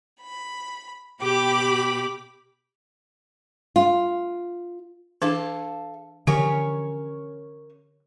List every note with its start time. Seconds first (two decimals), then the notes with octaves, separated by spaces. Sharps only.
0.21 B5
1.22 B2 G4 B5 D6
3.76 F4
5.22 E3 D4 A4 F5 A5 D6
6.27 D3 E3 F3 C#4 G4 A#4 C#5